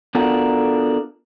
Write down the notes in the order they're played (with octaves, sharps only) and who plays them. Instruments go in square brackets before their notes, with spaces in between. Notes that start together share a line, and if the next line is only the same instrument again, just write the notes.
[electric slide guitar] B3 D4 F4 F#4 A4 A#4